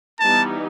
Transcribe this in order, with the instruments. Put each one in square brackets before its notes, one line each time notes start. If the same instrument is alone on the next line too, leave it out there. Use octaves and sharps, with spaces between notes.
[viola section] E3 G3 B3 D#4 [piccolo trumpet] A5